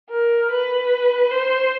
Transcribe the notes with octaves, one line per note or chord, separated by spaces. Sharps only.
A#4
B4
C5